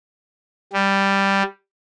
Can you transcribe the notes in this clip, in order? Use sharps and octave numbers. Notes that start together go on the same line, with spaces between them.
G3